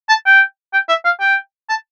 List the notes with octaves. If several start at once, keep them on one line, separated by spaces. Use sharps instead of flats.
A5
G5
G5
E5
F5
G5
A5